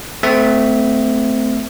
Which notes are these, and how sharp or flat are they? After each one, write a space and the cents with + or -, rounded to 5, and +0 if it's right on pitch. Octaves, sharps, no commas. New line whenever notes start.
A3 +0 C4 -30 E5 +0